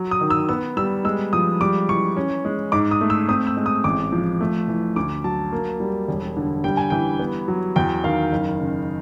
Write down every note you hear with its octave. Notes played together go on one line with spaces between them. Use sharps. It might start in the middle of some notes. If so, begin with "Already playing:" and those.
Already playing: F#3
D#6
D#3
E6
B3 E6
G3 E6
G#3 E6
F3 D#6
G3 D6
E3 C#6
C#4
G#3
G#2 D6
D#6
A3
E6
C4 D#6
E6
G#3
D#6
A1 D6
F3
A3
E3
D2 D6
F#3 A5
A#3
G3
E1
D3
G3 G5
G#5
E3 G5
B3
F#3
E2 G5
D#3 F5
F#1
C#3